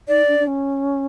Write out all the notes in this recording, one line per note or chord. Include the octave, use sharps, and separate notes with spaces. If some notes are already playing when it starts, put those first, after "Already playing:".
D#4 D5
D4
D4
C#4